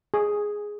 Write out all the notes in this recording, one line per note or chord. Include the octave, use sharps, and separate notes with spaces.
G#4